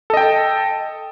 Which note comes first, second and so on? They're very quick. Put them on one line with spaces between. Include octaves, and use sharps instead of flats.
A4 D#5 G5 A5